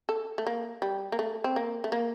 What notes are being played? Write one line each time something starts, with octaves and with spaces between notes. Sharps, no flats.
A4
A3
A#3
G3
A#3
A3
C4
A#3
A3
A#3